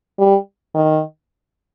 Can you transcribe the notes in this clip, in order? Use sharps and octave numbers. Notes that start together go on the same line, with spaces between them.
G3
D#3